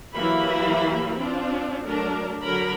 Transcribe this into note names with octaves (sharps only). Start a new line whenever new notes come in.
E3 F#3 A#3 G4 E5 B5
C4 D4 F4
F#3 A3 D4 A#4
D3 F#3 A#4 A#5 B5